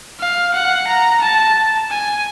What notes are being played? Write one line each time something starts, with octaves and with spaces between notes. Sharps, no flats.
F5
F#5
A#5
A5
G#5